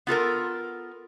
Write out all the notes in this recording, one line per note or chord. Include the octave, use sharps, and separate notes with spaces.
B3 F4 A4 A#4